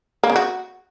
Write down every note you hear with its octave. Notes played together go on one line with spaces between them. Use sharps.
A#3
C#3
F#4